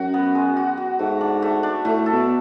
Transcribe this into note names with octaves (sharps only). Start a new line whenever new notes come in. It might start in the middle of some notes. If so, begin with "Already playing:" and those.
Already playing: F#2 F#4
B3
G#3
F#4
F#4
G#2 A3
D4
A3
D4
A2 A3
A4
B2